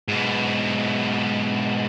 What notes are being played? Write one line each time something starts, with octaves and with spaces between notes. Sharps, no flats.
G#2 B2